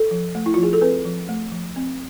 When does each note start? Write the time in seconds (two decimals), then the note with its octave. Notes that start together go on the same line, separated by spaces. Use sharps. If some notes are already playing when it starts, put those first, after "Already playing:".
Already playing: A4
0.11 F3
0.35 A3
0.46 E4
0.54 F3 F4
0.63 G#4
0.73 A4
0.81 C4 B4
1.05 F3
1.29 A3
1.51 F3
1.76 C4